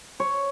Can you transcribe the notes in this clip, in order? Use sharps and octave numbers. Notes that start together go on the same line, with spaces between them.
C#5